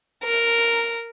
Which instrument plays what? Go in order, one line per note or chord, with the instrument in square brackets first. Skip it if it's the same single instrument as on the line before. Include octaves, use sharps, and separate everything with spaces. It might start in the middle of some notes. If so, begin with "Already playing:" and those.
[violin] A#4